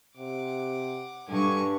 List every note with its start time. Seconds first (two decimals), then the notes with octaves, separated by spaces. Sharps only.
0.17 C3 F#5 D6
1.28 G2 D3 G#5 C#6